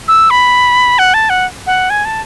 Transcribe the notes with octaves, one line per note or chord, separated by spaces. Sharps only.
E6
B5
F#5
A5
F#5
F#5
G#5
A5